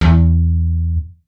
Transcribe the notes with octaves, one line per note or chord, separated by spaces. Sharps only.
E2